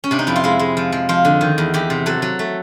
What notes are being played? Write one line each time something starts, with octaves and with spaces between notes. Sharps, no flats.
C#4
C3 D4
D#4
F2 E4
F4
G#3 E4
G#3
F3
F3
F3 F4
D3
D#3
E2
E2 G4
C3
F#3 A4
F#3
A3